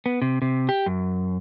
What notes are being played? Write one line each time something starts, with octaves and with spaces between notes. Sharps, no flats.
B3
C3
C3
G4
F#2